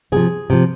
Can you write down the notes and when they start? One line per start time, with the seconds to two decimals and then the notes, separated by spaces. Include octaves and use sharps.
0.12 C3 F3 G#4
0.50 C3 F3